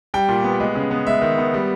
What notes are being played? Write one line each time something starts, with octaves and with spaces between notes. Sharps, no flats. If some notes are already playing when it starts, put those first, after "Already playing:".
G3 G5
A#2
B3
G#3
C#3
B3
G#3 E5
D#3
B3
G3